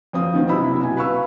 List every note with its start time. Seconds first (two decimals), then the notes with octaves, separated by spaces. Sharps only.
0.13 F2 C4 F5 D#6
0.33 D#3 B3 C4
0.49 F#2 C3 E4 B5 E6
0.80 B2 G#5
0.97 B4 F5 B5 C#6 E6